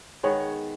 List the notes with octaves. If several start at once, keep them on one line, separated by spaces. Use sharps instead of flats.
D#3 G#3 B3 C#5